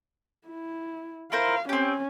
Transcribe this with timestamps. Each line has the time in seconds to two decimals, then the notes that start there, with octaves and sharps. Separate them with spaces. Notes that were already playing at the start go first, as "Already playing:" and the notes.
0.47 E4
1.32 E4 A#4 C5 F5
1.69 C4 C#4 G4